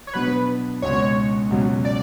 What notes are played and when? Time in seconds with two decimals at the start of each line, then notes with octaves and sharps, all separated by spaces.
0.07 C#5
0.14 B2 F#3 B3 D4 B4
0.82 C#2 B2 G#3 C#4 C#5
1.50 C#2 B2 F#3 C#4
1.85 D5